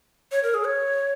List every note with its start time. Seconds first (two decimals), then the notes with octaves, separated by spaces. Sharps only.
0.32 C#5
0.43 A#4
0.54 G#4
0.64 C#5